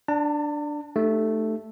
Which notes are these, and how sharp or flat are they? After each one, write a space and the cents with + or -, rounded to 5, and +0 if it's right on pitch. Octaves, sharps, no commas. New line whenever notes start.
D4 +0 A5 +45
A3 +0 D#4 -35 G4 +0